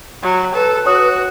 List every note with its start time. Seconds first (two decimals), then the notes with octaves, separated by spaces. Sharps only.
0.23 F#3
0.54 A4 B4
0.86 F#4 C#5 D#6